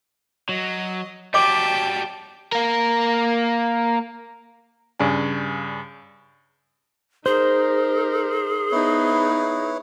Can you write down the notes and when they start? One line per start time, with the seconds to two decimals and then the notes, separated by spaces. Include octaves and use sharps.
0.49 F#3 D#5
1.34 F#3 G3 D#5 G5 A5 D6
2.52 A#3 A#4
4.99 G2 C#3 D5 G#5
7.26 D#4 G#4 A#4 C5
8.72 B3 D#4 E4 B4 C#5